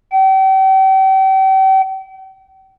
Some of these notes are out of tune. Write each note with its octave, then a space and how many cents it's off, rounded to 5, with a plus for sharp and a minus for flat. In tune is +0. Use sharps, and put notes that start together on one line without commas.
G5 -40